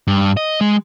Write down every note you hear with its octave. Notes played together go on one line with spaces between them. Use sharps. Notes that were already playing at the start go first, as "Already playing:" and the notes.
G2
D#5
G#3